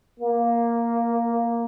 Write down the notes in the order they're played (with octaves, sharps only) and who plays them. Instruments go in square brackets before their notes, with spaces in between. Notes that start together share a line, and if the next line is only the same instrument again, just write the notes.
[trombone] A#3